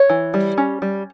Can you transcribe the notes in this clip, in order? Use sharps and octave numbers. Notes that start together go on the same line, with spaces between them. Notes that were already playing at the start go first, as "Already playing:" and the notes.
Already playing: C#5
E3
G3
C#4
G3